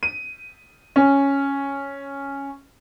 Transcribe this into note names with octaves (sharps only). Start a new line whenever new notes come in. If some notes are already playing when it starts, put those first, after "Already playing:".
D#7
C#4